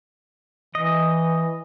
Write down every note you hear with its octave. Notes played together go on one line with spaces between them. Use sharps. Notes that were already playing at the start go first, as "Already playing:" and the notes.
E3 D#5